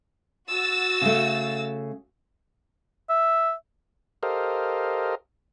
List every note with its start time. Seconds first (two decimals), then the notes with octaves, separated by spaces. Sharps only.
0.51 F#4 E6 A6
1.01 C#3 A3
3.09 E5
4.23 G4 A4 A#4 C5 D#5 F5